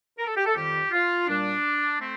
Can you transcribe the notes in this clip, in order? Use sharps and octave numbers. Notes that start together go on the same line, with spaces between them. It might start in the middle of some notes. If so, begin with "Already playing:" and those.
A#4
A4
G4
A4
F2 D#3 G3 G4
F4
A#2 G3 D4
A3 C4